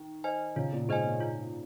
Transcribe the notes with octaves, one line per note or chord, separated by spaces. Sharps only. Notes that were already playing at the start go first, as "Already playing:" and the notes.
Already playing: D#3
C5 D#5 G#5
C#3 F4
A#2
G#2 G#4 C5 D#5 G#5
A#2
F4